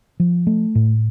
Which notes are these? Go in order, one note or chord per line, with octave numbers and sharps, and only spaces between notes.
F3
A3
A2